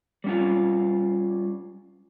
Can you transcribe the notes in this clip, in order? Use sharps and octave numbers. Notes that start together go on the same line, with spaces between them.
G3 C#4 F4